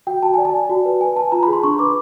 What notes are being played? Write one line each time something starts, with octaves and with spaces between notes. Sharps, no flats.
F#4 G5
F#4 A5
D5 G#5
A5
D5
F#4
B4
B4 G#5
B4 A5
F4 A#5
B5
G#4 C6
D4 C#6
B4 D6